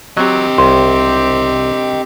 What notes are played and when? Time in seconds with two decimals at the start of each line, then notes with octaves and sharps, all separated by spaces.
0.17 F#3 C4 G4 D#5 G5
0.58 C2 C6